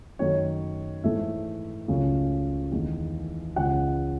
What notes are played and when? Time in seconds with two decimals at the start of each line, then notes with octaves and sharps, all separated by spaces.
0.19 F#2 D#3 F#3 A3 C#5
1.04 G#2 E3 A3 E5
1.88 C#2 C#3 F#3 A3
2.72 E2 D#3 A3
3.56 C#2 C#3 G#3 F#5